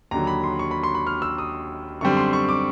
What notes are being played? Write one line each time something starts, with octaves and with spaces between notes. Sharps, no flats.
D#2 D3 F#3 A#5
B5
C6
C#6
B5
C6
B5
F6
E6
D#6
F#2 D3 G3 C4 C#6
C6
C#6
D6